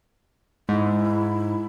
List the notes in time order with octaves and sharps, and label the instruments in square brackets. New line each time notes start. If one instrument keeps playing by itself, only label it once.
[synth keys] G#2 [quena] E4